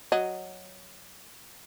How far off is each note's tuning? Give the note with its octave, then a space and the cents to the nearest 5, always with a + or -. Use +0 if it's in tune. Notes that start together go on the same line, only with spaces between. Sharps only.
F#3 +0 D#5 +0